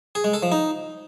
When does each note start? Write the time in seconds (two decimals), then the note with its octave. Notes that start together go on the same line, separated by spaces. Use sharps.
0.15 G#4
0.24 G#3
0.34 A4
0.43 F3
0.52 D#4